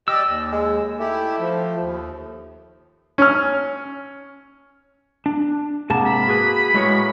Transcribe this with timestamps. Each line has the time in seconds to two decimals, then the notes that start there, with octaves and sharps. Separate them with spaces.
0.08 G4 D5 D#5 E6
0.28 D#2
0.53 G#3
1.00 A3 E4 G4
1.40 F3
1.81 D#2
3.18 C#4 F6
5.26 D4
5.90 G#2 C3 A#3 B3 A5
6.06 B5
6.27 F#4 G#4 B4
6.74 A2 G#3 F#4 C#5